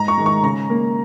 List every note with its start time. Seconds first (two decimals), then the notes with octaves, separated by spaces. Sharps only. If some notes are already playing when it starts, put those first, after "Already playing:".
Already playing: G#2 A#5
0.08 C#6
0.18 D#3 G#3
0.26 C#6
0.43 C#3 A#5
0.70 A#3